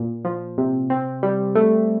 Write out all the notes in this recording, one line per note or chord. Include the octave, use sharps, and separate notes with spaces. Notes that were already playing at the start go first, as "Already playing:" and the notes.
Already playing: A#2
F3
C3
C4
G3
A3